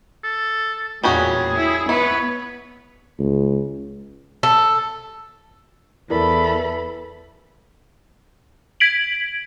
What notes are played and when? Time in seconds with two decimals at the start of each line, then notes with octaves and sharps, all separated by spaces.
0.23 A4
1.04 E2 A#2 G3 C#4 F#4 G#4
1.56 E4
1.89 B3 E4 B4 C#5
3.19 C#2
4.43 A4
6.10 E2 E3 E4 A4 A#4 D5 B5
8.80 G#6 B6 D7 F#7